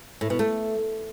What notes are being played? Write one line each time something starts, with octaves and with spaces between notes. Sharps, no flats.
A2
B2
A3